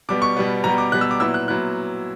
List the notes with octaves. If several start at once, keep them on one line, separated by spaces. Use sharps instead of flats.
B2 G3 B3 D6
C#6
B2 G3 B3
B2 G3 B3 A#5
D6
B2 G3 B3 F#6
E6
D6
A#2 F#3 B3 E4 E6
F#6
A#2 F#3 B3 E4 F#6